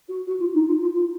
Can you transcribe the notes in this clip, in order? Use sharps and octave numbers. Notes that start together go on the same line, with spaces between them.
F#4
F#4
F4
D#4
F4
F4
F4